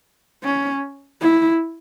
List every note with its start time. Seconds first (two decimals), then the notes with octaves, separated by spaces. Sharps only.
0.44 C#4
1.21 E4